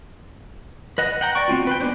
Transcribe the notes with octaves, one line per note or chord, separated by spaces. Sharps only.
B4 D#5 F#5
F#5 G5 A#5
D5 G5 C#6
C4 C#4 F4 F#4
B4 G5
G#3 B3 D4 C5